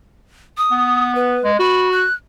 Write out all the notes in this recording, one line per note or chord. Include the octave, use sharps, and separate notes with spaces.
D#6
B3
B4
G#3
F#4 B5
F#6